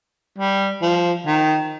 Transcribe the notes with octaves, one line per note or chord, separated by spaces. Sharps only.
G3
F3
D#3